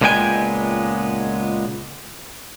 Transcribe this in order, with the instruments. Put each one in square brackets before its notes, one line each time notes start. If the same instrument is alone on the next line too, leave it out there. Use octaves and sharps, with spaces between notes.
[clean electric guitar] C#2 A#2 G#3 B3 G5 G#5